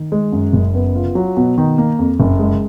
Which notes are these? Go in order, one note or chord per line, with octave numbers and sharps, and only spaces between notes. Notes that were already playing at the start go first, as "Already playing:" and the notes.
Already playing: D#3
G#3
F#2
F#1
B3
F4
F#3
B2
D#3
A#3
F2
F#1
G#3